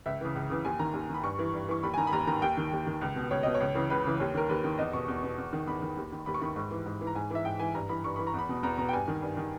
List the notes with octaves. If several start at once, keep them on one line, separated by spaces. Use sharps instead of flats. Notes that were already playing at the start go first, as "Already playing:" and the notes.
C#2 E5
C#3 E3
C#2
C#3 E3
D#2 G#5
D#3 A#5
D#2
D#3 B5
G2 C#6
E3
G2
E3 C#6
D#2 B5
G#5
D#3 A#5
B5
D#2 A#5
D#3 A#5
D#2 G5
D#3
D#2
D#3
C#2
B2
C#2 C#5
B2 D#5
C#5
C#2
C#3 E3
C#2 B4
C#3 E3
D#2 C#5
D#3 A#4
D#2 B4
D#3
E2 D#5
B2 C#6
E2
B2
E2
D#3
E2 B5
D#3
D#2
D#3
D#2 B5
C#6
D#3 B5
G#2
E3
G#2
E3
A#5
G#2 G#5
E3 E5
G#2 G5
E3 G#5
G2 A#5
E3 B5
G2 C#6
E3 B5
A#5
E2 B5
B2
E2 A#5
B2 A#5
G5
G2 G#5
D#3
G2
D#3